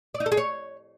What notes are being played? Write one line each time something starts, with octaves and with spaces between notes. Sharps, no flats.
D5
D#4
A4
G#4
C#5